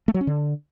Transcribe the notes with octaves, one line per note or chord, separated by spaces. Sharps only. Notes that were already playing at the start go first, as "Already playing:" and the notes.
A3
F#3
C#4
D3